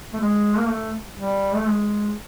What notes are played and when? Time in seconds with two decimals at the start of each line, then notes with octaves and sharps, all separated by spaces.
0.13 A3
0.20 G#3
0.57 A#3
0.68 A3
1.18 G3
1.55 A3
1.66 G#3